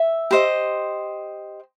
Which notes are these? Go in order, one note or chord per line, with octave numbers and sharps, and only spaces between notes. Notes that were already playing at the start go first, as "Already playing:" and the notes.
Already playing: E5
G4 C5 D#5